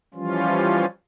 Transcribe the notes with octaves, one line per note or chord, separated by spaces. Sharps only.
E3 F3 G3 C#4 F4